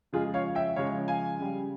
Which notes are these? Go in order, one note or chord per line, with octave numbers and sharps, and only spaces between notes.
C#3 F3 G#3 F4 G#4
C#5 F5
E5 G5
C#3 F3 G#3 C#5 F5
F5 G#5
C#3 G3